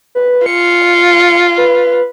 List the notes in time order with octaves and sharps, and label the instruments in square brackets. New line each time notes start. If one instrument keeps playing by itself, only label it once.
[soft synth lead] B4
[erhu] F4 [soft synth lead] C#7
[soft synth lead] B4